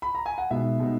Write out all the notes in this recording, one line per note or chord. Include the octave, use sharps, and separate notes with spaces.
B5
A#5
G#5
F#5
B2 G#3 B3 D#4 E5
B2 G#3 B3 D#4